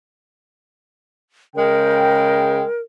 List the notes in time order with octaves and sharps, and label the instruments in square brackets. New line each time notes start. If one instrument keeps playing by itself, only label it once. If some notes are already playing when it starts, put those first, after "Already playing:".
[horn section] C#3 G#3 G5 [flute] A#4